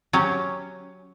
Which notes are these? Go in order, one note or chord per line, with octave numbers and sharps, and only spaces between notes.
F#3 C#4 G4